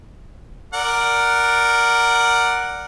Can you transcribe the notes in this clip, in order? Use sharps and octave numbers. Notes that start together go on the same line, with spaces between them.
A#4 D5 F#5